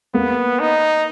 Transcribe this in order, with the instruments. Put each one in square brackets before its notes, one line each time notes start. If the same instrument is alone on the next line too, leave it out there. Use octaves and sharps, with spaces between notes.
[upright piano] A#3 [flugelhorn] B3
[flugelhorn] D#4